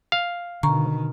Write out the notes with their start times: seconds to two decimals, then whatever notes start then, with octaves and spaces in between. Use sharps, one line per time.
0.12 F5
0.63 B2 D3 D#3 A#5 C#6